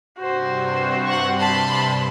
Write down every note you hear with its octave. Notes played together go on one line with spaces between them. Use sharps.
G2 C3 F#4 C5
F#5 C#6
A5 B5 C6